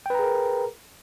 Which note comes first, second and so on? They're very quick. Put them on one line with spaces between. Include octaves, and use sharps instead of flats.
G5 B4 A#5 G#4 A#4